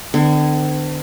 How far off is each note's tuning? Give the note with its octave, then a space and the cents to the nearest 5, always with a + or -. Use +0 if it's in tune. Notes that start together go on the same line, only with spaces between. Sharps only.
D3 +30 C4 -45